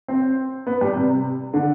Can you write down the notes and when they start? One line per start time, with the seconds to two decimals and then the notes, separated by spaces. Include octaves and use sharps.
0.08 C4
0.67 B3
0.81 G3
0.96 C3
1.54 D3